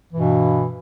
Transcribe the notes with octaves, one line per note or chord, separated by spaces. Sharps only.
G2 B2 E3